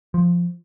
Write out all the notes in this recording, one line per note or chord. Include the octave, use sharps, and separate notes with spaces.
F3